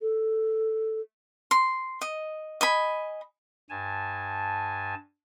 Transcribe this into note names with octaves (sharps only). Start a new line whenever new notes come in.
A4
C6
D#5
D#5 G#5 B5
G2 G#5 A5